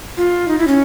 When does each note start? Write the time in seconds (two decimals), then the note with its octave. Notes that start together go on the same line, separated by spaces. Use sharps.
0.17 F4
0.48 D#4
0.59 E4
0.67 C#4